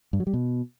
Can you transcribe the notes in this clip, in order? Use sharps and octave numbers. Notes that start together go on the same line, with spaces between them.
G2
F#3
G3
B2